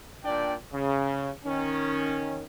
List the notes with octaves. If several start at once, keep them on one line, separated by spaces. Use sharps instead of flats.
A#2 D4 D5 G5
C#3
D#3 C#4